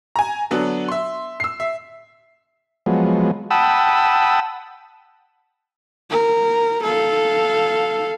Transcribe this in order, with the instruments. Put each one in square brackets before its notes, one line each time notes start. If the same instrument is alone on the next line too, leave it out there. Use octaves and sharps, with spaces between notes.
[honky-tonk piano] G#5 A#5
D3 F#3 B3 D4
E5 C6
E6 C7
E5
[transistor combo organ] F3 F#3 G#3 B3
F#5 G5 A5 B5 D#6 E6
[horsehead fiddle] A#4
A4 F5